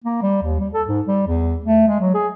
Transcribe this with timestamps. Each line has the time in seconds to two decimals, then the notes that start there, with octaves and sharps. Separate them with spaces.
0.04 A#3
0.22 G3
0.42 D#2
0.60 G3
0.73 A4
0.88 G#2
1.07 G3
1.27 E2
1.64 A3
1.88 G#3
2.00 F#3
2.14 G#4